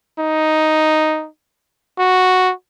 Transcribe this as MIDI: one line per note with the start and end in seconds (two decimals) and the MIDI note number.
0.19 1.28 63
1.99 2.53 66